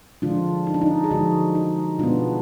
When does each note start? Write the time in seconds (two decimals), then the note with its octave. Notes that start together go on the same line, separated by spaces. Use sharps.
0.22 D3 F3 G#3 D4 F4
0.67 D#4
0.74 D4
0.81 D#4
1.04 G#4
1.11 D3 F3 G#3 D#4 F#4
1.55 D#4
1.99 B2 G#3 B3 D4 F4